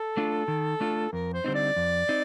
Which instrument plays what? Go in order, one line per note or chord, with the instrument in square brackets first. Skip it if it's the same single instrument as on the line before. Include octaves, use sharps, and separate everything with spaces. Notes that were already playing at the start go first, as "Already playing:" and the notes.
Already playing: [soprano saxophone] A4
[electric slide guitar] A3 D4 F4
D#3
A3 D4 F4
[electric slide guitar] F2 [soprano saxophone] A#4
[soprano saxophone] C5
[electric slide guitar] D3 G3 C4 D#4
[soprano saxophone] D5
[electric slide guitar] F2
C4 D#4